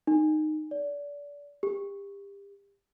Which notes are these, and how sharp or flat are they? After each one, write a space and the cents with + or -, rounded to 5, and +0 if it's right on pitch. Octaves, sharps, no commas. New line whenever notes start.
D#4 -15
D5 -30
G4 +30